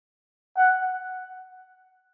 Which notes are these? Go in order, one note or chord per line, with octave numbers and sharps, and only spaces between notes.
F#5